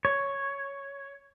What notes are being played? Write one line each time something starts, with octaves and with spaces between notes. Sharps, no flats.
C#5